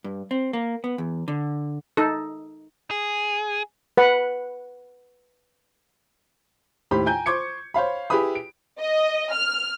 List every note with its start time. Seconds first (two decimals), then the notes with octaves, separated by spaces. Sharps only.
0.04 G2
0.31 C4
0.53 A#3
0.84 B3
0.98 E2
1.28 D3
1.97 D#4 A4
2.91 G#4
3.97 B4 F#5
6.91 D#2 A2 G4 C5 B5
7.06 G5 G#5 A#5 G6
7.26 C5 C#6 D6 G#6 C#7
7.74 C5 C#5 F5 B5
8.10 E4 G4 G#4 B4 B5 D#6
8.35 D7
8.80 D#5
9.33 F6